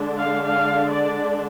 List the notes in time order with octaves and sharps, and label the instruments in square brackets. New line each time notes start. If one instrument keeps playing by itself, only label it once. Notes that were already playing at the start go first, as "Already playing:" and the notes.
Already playing: [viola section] D3 G#3 D4
F5
F5
D5